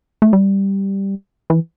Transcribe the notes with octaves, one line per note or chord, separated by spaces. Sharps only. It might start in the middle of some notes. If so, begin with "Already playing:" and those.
A3
G3
E3